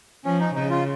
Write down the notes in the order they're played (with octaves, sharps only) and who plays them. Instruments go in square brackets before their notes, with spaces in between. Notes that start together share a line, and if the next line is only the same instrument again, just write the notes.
[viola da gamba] F3 [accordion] C#4
[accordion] D#4
[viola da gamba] C#3 [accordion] D#4
[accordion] F4